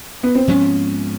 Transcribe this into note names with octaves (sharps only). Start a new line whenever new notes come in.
B3
C4
G#2 F3 G#3 B3 C#4